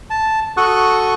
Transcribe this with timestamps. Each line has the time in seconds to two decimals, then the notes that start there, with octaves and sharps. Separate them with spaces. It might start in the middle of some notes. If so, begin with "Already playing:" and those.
0.10 A5
0.57 F#4 A4 F#5 C#6 D#6 F#6